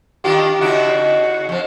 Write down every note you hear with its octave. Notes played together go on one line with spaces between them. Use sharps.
D#3 D4 F4 G4
C#3 D#4 E4 F#4
F2 F3